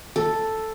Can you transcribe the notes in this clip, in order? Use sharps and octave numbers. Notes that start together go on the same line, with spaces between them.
A4